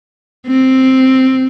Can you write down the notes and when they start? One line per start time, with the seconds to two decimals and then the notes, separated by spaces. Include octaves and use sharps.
0.47 C4